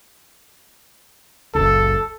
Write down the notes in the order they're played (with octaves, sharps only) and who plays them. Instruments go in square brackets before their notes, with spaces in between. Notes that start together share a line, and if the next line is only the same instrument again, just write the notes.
[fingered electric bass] F#1 C#2 [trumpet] A4